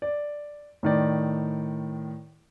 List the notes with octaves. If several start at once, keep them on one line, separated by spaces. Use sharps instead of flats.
D5
A2 D#3 D5